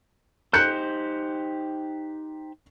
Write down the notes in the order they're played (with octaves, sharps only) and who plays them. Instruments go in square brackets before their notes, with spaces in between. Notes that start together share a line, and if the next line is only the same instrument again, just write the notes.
[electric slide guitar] D#4 G4 C5 [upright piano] F#6 G6 C#7